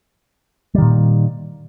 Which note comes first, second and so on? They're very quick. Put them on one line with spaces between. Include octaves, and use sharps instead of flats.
G3 D#3 A#2